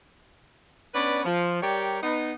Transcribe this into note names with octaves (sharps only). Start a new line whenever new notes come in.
B3 C#4 D4 B4 D5 B5
F3
G3 G4 A#4 C#5 D5 G5
B3 D#4